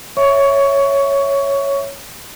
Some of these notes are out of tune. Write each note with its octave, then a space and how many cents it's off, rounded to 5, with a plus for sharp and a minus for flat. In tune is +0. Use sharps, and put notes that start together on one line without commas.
C#5 +0 E5 +0 C#6 +20